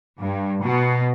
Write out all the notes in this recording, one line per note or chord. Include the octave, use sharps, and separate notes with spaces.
G2
B2